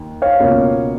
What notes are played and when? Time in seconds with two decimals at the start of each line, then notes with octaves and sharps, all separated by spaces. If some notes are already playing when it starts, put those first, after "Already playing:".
Already playing: D#2
0.22 C#5 F5
0.39 C#2 B2 A#3 C#4 F4